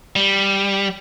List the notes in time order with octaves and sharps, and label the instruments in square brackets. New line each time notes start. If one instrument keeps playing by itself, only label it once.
[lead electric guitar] G3